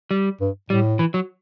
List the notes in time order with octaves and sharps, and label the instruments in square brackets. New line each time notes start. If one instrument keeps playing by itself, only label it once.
[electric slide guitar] G3
[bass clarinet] G2
[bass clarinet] A2 [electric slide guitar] G3
[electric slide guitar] E3
F#3